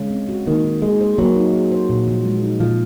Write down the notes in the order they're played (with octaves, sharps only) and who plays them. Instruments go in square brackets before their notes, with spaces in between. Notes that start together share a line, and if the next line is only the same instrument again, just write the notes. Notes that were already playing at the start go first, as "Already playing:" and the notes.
Already playing: [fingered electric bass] C#3 [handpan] G#3
[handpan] C4
F#4
[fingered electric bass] D#3 [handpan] A#3
[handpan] D#4
[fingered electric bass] G#3 [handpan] G#4
[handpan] C5
[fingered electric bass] F#3 [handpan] A#3
[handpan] D#4
G#4
C5
A#2
F3
G#3
D#4
[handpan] A#2 [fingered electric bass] F3